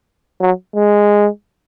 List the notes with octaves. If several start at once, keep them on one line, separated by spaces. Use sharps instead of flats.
F#3
G#3